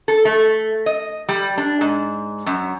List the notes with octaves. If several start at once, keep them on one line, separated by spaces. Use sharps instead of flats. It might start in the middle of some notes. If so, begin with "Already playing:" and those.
A4
A3
D#5
G3
D4
G#2
F#2